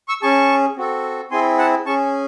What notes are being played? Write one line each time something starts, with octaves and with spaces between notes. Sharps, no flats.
C#6 E6
C#4 G#4 A5 C#6
C4 F#4 A4
C4 E4 G#4 G#5 C6
F#5 A5
C#4 G#4 A5 C#6